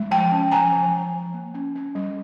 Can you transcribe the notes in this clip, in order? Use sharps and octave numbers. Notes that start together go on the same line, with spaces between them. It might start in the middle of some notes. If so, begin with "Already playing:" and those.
Already playing: G#3
F3 G5 A5
C#4
F3 G#5 A#5
F3
F3
F3
A#3
C#4
C#4
G3